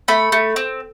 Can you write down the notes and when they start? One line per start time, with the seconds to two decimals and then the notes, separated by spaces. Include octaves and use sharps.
0.08 A3 B5
0.32 A3
0.56 C4